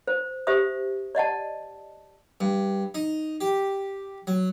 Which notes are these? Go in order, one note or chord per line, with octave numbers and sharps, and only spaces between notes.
C5
G4 C5 E5 D#6
D5 D#5 F#5 A5
G2
D#4
G4
F#3